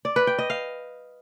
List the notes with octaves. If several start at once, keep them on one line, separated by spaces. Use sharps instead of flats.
D5
B4
G5
D#5
F5